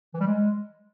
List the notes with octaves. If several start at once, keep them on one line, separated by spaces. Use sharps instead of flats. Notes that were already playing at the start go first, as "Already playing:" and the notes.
E3
G3
G#3